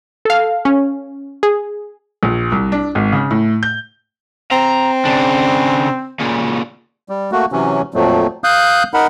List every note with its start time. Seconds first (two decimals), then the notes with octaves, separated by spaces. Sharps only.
0.25 A4 F5
0.65 C#4
1.43 G#4
2.23 A#1
2.52 C2
2.72 D4
2.95 G#1
3.12 C#3
3.31 A2
3.63 G6
4.51 C4 A#5
5.05 C#3 D4
6.20 A#2 C#3
7.09 G3
7.32 A3 A#3 F#4
7.52 C3 E3 F#3 C#4
7.94 F2 A#2 F3 F#3 A3
8.44 F5 D#6 F#6 G6
8.94 D#4 A#4 F#5 B5